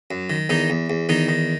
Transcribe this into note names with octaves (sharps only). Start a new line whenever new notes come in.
F#2
D#3
E2 D#3 D#4
E2
E2
E2 D#3 D#4
D#3